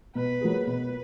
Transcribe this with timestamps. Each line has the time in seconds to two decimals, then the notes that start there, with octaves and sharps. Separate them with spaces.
0.15 B2 B4
0.41 F#3 A#3 F4 G#4
0.67 B2 B4